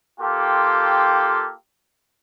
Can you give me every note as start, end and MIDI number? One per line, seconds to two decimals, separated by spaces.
0.20 1.51 58
0.20 1.51 65
0.20 1.51 67
0.20 1.51 69
0.20 1.51 79
0.20 1.51 84